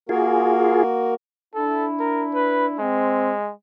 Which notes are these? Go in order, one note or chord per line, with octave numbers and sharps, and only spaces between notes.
A#3 F4 F#4 G#4 A#4
D4 E4 A4
A#4
B4
G#3 C4